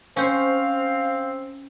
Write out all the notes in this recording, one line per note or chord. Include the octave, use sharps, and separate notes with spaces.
C4 C#4 C5 F5